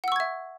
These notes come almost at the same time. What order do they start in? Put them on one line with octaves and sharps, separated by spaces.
F#5 E6 C#6 G#6 E5